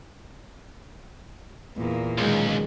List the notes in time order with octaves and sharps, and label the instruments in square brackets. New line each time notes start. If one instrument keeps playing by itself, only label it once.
[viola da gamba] E2 [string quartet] A#2 A#3
[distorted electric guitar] C#2 [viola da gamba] B2 D#3 F#3 [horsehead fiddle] G#3